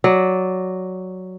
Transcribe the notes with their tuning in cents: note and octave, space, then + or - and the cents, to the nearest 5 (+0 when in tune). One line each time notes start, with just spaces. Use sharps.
F#3 +0 D5 +0